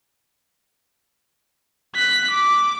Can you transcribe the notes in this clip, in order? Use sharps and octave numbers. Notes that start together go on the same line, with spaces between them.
F#6 B6
D6